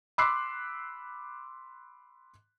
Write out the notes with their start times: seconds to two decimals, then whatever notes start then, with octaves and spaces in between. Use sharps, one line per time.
0.18 B5 C6 D6 E6 F#6 C7